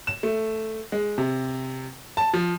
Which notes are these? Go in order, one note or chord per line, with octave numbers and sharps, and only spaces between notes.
E7
A3
G#3
C3
A5
F3